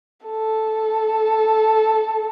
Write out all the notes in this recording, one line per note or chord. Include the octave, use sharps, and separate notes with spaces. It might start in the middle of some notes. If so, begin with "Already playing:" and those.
A4